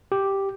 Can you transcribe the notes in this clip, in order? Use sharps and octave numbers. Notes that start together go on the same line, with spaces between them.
G4